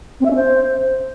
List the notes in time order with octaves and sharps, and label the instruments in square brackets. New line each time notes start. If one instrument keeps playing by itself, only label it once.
[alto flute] C4
E5
C#4
C5